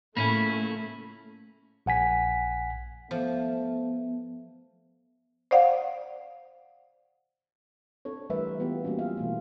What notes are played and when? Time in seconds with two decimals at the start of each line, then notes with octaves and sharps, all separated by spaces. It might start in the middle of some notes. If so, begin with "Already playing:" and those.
0.17 A2 C#3 F3 A3 A#3 C#4 E4 B5
1.86 A#1 F#5 G#5 B6
3.11 F3 A3 B3
5.51 C5 D5 F5 F#5
8.05 C4 D4 A4 C#5
8.30 E3 G3 A3 A#4 B4 E5
8.59 E3 G#3 B3 C4 F4 G4
8.83 G3 A#3 B3 C#4 F#4 G4
8.98 B3 F4 E5 F5
9.17 B2 E3 A3